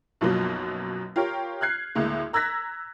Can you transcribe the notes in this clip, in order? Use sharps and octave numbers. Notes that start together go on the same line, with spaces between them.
B1 F#2 B2 F3 F#3 A#3
F4 G4 A#4 C#5
F6 F#6 G#6 C7
D2 A2 G#3 A#3
A#5 E6 F#6 G#6 A#6 B6